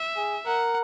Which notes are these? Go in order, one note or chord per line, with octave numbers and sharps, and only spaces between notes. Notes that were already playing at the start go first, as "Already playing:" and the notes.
Already playing: E5
G#4
A#4 F#5